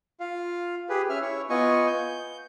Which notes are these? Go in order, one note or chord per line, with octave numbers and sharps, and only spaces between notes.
F4 F5
G4 G#4 B4
C#4 E5 F6
E4 C#5
B3 F4 D#5 G#5 C#6
G6